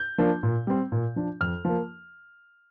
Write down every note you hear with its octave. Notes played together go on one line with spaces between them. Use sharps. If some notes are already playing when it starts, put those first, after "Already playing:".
Already playing: G6
F3 A#3 D4
A#2
G3 C4
A#2
F3 D4
F2 F6
F3 A#3